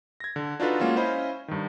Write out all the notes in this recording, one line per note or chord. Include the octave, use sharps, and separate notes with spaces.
G#6 A#6
D3
D4 D#4 F4 F#4 A4 B4
G#3 A#3 C#4 F4 F#4
C#4 E4 C5 D#5 F5 B5
G2 D#3